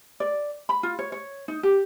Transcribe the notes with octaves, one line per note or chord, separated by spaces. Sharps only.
D5
B5
F4
C#5
C#5
D#4
G4